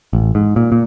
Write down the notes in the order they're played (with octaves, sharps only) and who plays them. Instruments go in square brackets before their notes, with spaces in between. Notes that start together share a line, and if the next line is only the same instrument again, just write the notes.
[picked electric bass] A1
G#2
A#2
A#2